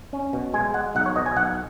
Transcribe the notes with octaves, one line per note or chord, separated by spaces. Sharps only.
C#4
B2
G#3 G#5
G#3 F#5
B1 F#5
C#5
B2 D#5
G#5
B1 F#5